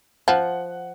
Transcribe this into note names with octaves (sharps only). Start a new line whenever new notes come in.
F3 F#5